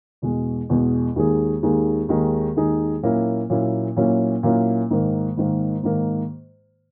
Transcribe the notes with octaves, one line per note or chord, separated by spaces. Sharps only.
E2 B2 G#3
E2 B2 G#3
D#2 D#3 G#3 D#4 G#4
D#2 D#3 G#3 D#4 G#4
D#2 D#3 G#3 D#4 G#4
D#2 D#3 G#3 D#4 G#4
A#2 F#3 A#3 C#4 E4
A#2 F#3 A#3 C#4 E4
A#2 F#3 A#3 C#4 E4
A#2 F#3 A#3 C#4 E4
G#2 D#3 A#3
G#2 D#3 A#3
G#2 D#3 A#3